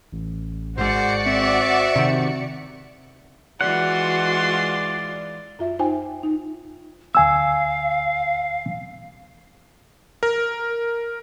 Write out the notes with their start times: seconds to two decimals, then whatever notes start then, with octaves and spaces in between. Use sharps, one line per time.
0.12 A1
0.78 G#1 G#2 F#4 C5 D5 C#7
1.26 C4 E5
1.96 C3 D#3
3.61 E3 G#3 F4 F#4 D5 F#5 C6
5.59 F#2 F4 E5
5.79 D#4 F4 C5 G5 G#5
6.23 D#4
7.15 D2 F5 G#5 E6
10.23 A#4